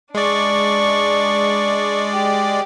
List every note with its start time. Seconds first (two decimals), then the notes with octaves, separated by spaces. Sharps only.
0.15 G#3 D4 D5 C#6
2.12 G4